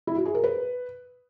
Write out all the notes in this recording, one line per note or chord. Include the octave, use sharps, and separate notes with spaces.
E4
F#4
G#4
A#4
B4